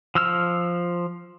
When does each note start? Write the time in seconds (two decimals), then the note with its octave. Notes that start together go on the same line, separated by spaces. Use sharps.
0.15 F3 E6 F6